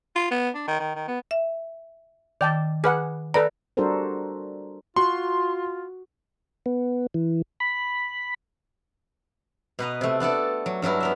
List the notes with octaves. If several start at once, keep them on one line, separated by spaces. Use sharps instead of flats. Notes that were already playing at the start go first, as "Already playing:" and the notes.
F4
B3
D4
D#3
D#3
D#3
B3
E5
D#3 D5 G5 A5
G#4 B4 F#5 D6 F6
A4 B4 D5 A#5
G3 D4 F#4 A4 A#4 C5
F4 F#4 C6
B3
E3
B5
B2 B4 D#5 A#5
C3 A3
B3 D4 A4 D5
F#3
G2 F#3 D4 E4 A#4
B3 A#4 E5